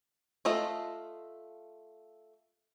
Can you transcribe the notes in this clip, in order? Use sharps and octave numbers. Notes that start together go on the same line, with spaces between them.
A3 F4 A4 D#5